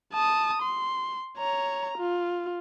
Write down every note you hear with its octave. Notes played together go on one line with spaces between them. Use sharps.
A5 D#6
C6
C#5 A#5
F4